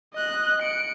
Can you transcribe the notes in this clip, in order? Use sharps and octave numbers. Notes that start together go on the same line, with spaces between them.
D#5 F#6
C#7 D7